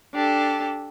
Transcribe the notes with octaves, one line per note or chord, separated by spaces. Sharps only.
D4 G4 A4